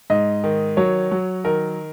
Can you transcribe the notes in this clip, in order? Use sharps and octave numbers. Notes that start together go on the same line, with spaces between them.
G#2 D#5
D#3
F#3 C#5
F#3
D#3 A#4